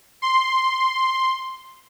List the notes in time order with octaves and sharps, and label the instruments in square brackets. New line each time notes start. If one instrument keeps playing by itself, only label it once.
[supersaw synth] C6